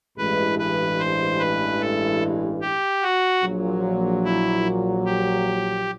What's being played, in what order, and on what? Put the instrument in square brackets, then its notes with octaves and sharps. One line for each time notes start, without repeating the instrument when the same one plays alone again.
[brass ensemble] A1 G2 E3 G#3 [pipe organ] B4
[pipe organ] B4
C5
B4
A4
G4
F#4
[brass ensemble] A#1 A#2 F#3
[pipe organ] E4
G4